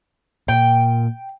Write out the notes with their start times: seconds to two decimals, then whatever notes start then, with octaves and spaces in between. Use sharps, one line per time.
0.48 A#2 G5